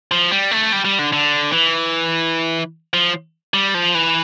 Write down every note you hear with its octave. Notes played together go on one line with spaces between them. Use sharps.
F3
G3
A3
G3
G3
D3
D3
E3
F3
G3
F3
E3